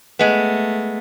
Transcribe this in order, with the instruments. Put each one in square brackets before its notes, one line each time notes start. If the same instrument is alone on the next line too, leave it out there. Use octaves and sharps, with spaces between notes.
[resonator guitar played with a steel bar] G#3 B3 [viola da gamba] A3